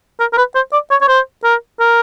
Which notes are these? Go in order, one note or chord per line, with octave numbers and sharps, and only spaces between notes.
A#4
A#4
B4
C5
D5
C#5
C#5
C5
A#4
A#4